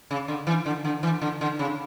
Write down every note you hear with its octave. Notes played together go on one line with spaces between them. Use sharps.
C#3
D3
E3
D3
D3
E3
D3
D3
C#3